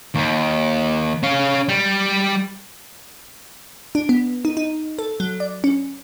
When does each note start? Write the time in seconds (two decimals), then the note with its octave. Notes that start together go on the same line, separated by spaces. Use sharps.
0.15 D#2
1.23 C#4 F5
1.69 G3
3.95 D4
4.09 B3
4.45 D#4
4.57 D#4
4.99 A4
5.20 F#3
5.40 D5
5.64 C#4